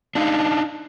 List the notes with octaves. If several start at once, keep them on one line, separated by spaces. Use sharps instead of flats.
D4 D#4 F5